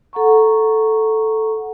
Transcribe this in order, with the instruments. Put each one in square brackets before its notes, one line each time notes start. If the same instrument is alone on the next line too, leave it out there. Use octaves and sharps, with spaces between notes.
[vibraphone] A4 F#5 A#5 C#6